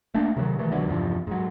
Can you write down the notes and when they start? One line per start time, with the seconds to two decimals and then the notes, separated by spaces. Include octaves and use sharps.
0.14 A3 A#3 D4
0.37 C3 D#3 F#3
0.57 C3 D#3 E3 A3
0.71 B1 D3 E3 F#3
0.88 E2 G2 C3 F3
1.27 G#2 F#3